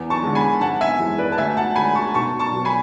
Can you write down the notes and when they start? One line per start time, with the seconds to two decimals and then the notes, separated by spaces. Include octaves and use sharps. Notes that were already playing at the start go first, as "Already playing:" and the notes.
Already playing: E2
0.10 A5 C#6
0.23 D3 G#3
0.35 G#5 B5
0.61 G#1 F#5 A5
0.81 E5 G#5
0.99 F#2 E3 G#3
1.18 B4 D5
1.32 A5
1.38 D2 E5 G#5
1.57 F#5 A5
1.76 D3 G#3 G#5 B5
1.95 A5 C#6
2.14 B1 A5 C#6
2.39 A5 C#6
2.53 B2 F#3
2.65 G#5 B5